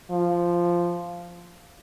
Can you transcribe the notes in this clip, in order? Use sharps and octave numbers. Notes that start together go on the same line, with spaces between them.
F3